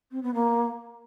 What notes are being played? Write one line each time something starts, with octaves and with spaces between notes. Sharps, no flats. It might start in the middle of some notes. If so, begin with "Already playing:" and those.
C4
B3
A#3